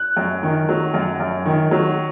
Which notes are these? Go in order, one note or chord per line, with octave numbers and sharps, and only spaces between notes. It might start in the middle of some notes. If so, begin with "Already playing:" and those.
Already playing: F#6
F#2
D#3
F#3
F#2
F#2
D#3
F#3